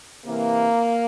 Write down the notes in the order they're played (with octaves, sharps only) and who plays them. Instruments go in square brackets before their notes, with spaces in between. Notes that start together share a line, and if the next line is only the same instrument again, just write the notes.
[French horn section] C3 E3 A#3